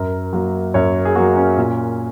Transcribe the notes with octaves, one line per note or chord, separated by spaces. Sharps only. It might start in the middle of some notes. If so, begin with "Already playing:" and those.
Already playing: F#2 A#4
F#3 A#3
F#2 C#5
G#4
F#3 A#3 F#4
C#4
A#2